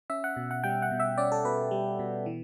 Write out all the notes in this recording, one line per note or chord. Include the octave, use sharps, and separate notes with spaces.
C#4 E5
F#5
B2
F#5
G3 G5
F#5
B2
E5
C#4 D5
A4
B2 B4
G3
B2
E3